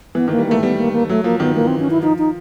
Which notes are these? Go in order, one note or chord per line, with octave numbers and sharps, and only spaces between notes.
E3 B3
D#3 A#3
G3
A3 A#3
G3 B3
A#3
A#3
F#3 A3
F3 A#3
D#3 B3
E3 A#3
C4
C#4
E4
F3 D#4
D#4